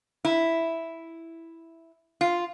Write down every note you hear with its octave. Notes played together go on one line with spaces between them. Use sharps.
E4
F4